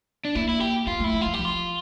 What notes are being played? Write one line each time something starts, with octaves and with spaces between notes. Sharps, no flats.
D4
A#3 E4
E4
G4
A#3 F4
A3 E4
F3
E3 F4
G4
F3
F4